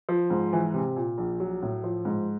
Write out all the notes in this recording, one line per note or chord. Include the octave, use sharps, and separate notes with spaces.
F3
G#2
E3
C3
A#2
A#1
F#3
A2
F3
G#2